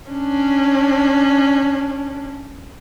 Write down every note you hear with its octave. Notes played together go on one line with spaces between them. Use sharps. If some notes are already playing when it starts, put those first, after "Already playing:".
C#4 D4